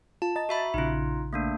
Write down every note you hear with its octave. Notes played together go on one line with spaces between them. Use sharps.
F4 A5
D#5 A#5 A6
F#4 E5 B5
A#1 C#3 D#4 F4
A3 A#3 D4